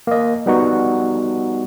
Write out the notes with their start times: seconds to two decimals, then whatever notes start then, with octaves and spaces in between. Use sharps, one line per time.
0.07 A#3 D#5
0.46 G3 B3 D#4 F#4